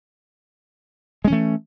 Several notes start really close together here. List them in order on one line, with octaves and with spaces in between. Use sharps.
G#3 C#4 E3 A3